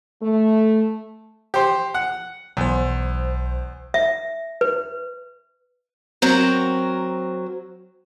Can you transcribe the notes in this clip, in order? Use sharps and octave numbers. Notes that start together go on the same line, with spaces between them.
A3
G4 C5
F#5
B1 E2 C5
E5
B4
F#3 C4 A#4